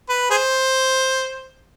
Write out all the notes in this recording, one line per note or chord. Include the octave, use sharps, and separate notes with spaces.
B4
G#4 C5